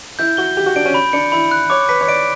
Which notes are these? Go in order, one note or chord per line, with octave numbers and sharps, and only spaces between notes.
E4 G6
F#4 G7
G4 G6
F#4
D4 D7
C#4
B5
D4 C#7
E4 B5
F#6
C#5 D6
B4 B6
C#5
D5 D7